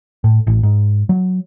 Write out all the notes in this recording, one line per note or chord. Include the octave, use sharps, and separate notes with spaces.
A2
A1
G#2
F#3